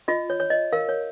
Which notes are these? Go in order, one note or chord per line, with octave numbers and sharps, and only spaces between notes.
F4 D#5
C#5
C#5
D#5
A#4 F5
C#5